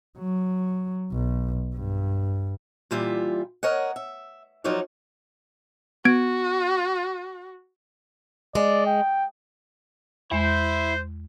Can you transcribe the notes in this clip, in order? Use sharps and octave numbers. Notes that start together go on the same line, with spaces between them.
F#3
B1
G2
A#2 E3 G3 F4 E5
A#4 C#5 D#5 F#5
E5
F3 F#3 D#4 A#4 C#5 D5
B3 F#4 G#6 D7
G#3 D5
G5
E2 G#3 E4 C5